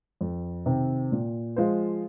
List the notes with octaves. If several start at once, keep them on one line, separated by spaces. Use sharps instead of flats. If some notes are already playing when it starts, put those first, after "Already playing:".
F2
C3 D#3 C4
A#2
F3 G#3 F4 C5